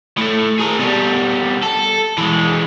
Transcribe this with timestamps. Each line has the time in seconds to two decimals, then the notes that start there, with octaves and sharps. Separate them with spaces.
0.17 A2 A3
0.59 G#4 A#4
0.79 B2 G3
1.63 A4
2.18 E3 G#3